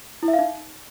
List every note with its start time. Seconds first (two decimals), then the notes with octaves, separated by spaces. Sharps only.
0.23 E4
0.28 E5
0.33 F5
0.39 D#4